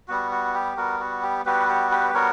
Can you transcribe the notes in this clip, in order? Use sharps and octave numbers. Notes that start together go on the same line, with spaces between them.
G3 B3 F#4
F#4
G4
G3 B3 F#4 A#4
F#4
G4
G3 B3 F#4 G4 B4
G4
G4 B4
G3 B3 F#4 A#4 C#5